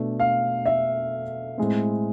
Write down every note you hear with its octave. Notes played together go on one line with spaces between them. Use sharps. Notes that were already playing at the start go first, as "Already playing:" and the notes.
Already playing: B2 A3 D4
F5
E5
A2 G#3 C4